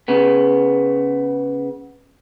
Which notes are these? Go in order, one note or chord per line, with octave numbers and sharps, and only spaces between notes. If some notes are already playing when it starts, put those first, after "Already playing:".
C#3 B3